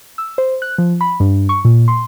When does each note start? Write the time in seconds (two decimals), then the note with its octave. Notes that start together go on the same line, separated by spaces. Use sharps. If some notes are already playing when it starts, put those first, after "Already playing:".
0.18 E6
0.38 C5
0.62 F#6
0.78 F3
1.01 B5
1.20 G2
1.49 C#6
1.65 A#2
1.88 C6